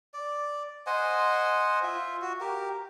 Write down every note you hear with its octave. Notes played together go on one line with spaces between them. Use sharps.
D5
C5 D#5 F#5 G#5
F4 E5
F#4
G4 A#4